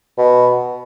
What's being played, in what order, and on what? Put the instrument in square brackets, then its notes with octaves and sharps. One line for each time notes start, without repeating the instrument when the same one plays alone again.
[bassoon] B2